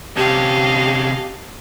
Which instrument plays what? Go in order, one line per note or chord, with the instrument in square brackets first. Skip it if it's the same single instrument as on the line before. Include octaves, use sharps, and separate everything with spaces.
[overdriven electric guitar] C3 C#4 [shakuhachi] G4 [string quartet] D#5 F5 A5